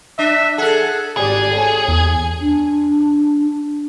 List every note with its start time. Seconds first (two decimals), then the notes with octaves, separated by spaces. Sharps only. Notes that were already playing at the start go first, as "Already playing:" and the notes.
0.19 D4 E5
0.58 G#4 A4 F#5
1.17 G#1 G3 G#4 D5
1.53 A4 C#5
1.88 E2 G#5
2.40 D4